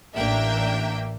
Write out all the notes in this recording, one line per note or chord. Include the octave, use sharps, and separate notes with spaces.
A1 A#3 D4 A#4 E5 G5